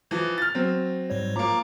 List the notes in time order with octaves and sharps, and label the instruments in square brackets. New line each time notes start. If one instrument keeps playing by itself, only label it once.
[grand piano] E3 F3
F6 A6
F#3 C4
[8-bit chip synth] G#2 G3 C#5
[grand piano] F3 A#3 [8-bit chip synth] A#5 D6